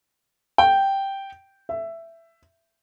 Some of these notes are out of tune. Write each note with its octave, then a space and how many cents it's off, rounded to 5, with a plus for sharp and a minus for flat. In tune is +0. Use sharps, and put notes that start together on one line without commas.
G5 -5
E5 +10